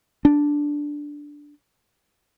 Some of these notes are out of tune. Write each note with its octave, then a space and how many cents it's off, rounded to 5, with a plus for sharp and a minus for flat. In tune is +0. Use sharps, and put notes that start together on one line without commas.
D4 -5